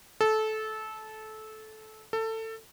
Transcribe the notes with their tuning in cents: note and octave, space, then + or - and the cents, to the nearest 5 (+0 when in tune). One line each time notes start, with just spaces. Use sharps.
A4 -20
A4 +20